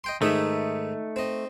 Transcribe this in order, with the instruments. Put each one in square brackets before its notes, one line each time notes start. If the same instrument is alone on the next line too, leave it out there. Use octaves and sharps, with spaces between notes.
[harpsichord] D#5 G5 C6
[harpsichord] G#2 D#3 G#4 [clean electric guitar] A3 [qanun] D#4 E5
[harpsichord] C4 D#5